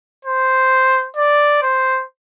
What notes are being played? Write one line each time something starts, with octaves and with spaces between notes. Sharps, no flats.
C5
D5
C5